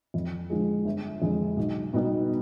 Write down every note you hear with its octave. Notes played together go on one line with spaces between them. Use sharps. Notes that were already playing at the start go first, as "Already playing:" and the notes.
F2
D3 F3 G#3
G1
F2 D3 G#3
B1
B2 G3 B3 D#4